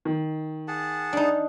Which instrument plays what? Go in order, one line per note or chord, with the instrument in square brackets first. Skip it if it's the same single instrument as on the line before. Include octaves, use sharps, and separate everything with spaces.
[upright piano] D#3
[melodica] G#4 F#5 A5
[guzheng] D4 D#4